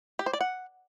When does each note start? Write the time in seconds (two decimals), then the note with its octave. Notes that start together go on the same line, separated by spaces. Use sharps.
0.19 G4
0.26 C5
0.33 D5
0.41 F#5